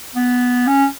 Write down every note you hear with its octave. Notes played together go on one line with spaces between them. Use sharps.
B3
C#4